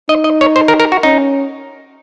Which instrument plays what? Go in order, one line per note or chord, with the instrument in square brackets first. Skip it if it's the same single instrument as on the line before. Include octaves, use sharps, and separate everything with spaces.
[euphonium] D#4 [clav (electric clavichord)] D#5
[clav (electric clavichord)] D#5
C#5
C5
A#4
A#4
F#4
[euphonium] C#4 [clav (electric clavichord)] D#4